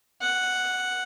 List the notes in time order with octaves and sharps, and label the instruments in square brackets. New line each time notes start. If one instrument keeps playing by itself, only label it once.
[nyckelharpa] F#5